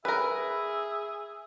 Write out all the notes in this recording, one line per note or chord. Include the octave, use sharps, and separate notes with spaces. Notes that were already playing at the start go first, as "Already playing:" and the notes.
G#4 A#4 B4 E5